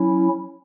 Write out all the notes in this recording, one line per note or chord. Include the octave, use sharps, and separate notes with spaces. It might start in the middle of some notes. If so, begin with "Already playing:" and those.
Already playing: F#3 C#4 E4